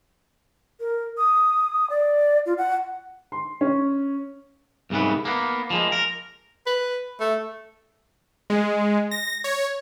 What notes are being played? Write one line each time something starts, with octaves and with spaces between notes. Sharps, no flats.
A#4
D#6
D5
F4
F#5
C6
C#4
C2 G#2 C#3 E3 B3
A#3 B3
F3 G#3 A#3
A#4
B4
A3
G#3
A#6
C#5